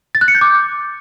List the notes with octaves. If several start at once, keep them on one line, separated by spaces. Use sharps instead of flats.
A6
F#6
C#7
G6
D6